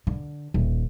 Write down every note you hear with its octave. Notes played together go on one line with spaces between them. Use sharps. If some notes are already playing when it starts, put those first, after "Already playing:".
D3
D#1